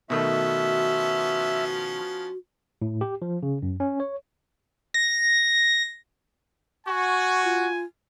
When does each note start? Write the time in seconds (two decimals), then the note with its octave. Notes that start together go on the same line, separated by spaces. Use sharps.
0.10 B2 D#3 F3 A3 B3 C#4 F#4 E5
2.82 A2
3.01 G4
3.22 F3
3.43 C#3
3.62 F#2
3.80 C#4
4.00 C#5
4.94 A#6
6.87 F#4 G#5 C#6
7.44 F4